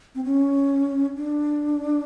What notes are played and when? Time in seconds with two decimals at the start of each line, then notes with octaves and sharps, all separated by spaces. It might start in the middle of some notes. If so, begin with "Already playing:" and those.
0.15 C4
0.24 C#4
1.16 D4